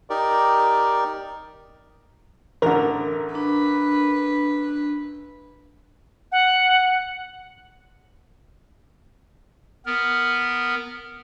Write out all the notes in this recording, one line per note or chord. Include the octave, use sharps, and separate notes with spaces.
D#4 G4 A#4 D5
A1 D3 A#4
D4 B4
F#5
B3 A#4